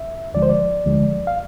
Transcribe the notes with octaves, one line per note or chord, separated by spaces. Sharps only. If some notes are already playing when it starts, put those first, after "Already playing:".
Already playing: E5
D2 D3 F3 G#3 D5
C5
D5
D2 D3 F3 G#3
F5